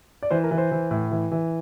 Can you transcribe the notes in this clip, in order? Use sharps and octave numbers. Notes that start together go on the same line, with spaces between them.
D5
E3 C5
A#4
E3
C5
E3
A2
E3
E3